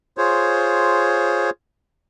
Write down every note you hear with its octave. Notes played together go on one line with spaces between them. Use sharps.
F4 G#4 C5 C#5